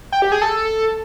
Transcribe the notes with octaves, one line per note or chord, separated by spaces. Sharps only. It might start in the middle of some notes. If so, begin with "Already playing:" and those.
G5
G4
G#4
A4